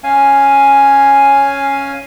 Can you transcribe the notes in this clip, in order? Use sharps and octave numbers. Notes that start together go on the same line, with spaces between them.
C#4 F5 G#5